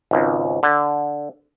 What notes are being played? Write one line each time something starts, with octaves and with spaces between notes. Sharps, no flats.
G#1 C#2
D3